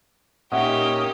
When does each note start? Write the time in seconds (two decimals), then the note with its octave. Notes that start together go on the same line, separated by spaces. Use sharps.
0.52 A#2 C#4 D#4 G4 D#5 E5 F#5